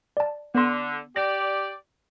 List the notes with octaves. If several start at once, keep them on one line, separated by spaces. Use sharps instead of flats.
D5 A5
D3 B3 C6
G4 D5 A#6